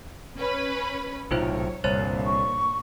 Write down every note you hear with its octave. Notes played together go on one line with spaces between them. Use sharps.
C#4 B4 B5
B1 A2 C3 D#4 F4 C5 C#5
C2 G2 A#2 D3 C5 C#5 A6
C#6